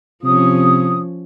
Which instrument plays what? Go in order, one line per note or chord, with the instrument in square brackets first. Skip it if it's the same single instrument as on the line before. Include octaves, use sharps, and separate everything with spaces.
[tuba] C3 [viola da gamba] F3 C#4 [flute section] D#6